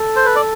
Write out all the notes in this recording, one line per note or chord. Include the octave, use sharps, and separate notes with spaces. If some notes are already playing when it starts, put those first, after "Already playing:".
Already playing: A4
C5
B4
D5